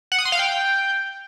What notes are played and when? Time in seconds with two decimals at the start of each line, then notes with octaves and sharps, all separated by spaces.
0.12 F#5
0.18 D#6
0.25 C6
0.32 F5
0.39 G5